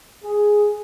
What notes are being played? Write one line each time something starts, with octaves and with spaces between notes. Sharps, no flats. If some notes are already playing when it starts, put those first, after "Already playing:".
G#4